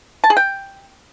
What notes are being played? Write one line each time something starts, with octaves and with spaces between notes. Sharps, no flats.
A5
G#4
G5